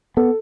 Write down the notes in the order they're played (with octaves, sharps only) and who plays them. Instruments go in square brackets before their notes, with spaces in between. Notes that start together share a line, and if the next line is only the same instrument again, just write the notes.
[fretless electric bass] B3 [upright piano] A4